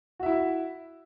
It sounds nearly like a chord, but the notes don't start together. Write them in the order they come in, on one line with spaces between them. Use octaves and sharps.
F#4 E5 E4